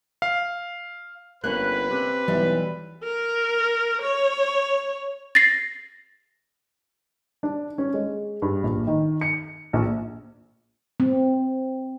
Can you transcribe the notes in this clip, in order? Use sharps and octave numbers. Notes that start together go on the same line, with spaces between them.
F5
G1 A#3 C#4 B4 F#6
C3
B1 E3 G3
A#4
C#5
A6 A#6 C7
D4
C#4
G#3
G2
A#1
D#3
C#7
A#1
C4